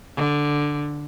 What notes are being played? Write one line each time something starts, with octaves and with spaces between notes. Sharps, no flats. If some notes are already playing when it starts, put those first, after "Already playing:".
D3